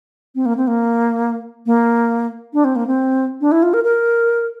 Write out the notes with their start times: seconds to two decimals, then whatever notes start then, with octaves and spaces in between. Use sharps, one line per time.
0.35 C4
0.46 A#3
0.57 C4
0.67 A#3
1.66 A#3
2.53 D4
2.64 C4
2.76 A#3
2.87 C4
3.41 D4
3.52 E4
3.63 F4
3.74 A#4
3.84 A#4